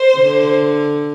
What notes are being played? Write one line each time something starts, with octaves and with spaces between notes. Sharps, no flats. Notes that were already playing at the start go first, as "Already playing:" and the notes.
Already playing: C5
D3